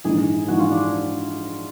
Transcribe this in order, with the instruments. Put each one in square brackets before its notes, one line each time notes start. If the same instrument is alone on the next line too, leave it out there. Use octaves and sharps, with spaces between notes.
[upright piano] A#1 G#2 E3 [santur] G#4
[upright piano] A#1 G#2 E3 [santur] F#4
[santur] F4
D4